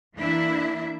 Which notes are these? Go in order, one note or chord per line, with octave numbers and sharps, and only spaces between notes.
E3 A#3 D4 E4 E5